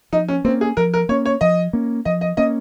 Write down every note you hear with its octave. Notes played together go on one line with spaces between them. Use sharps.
F3 D#4
C#4
A#3 C4 C#4
G#4
F3 A#4
A#4
A#3 C#4 C#5
C#5
F3 D#5
A#3 C#4
F3 D#5
D#5
A#3 C#4 D#5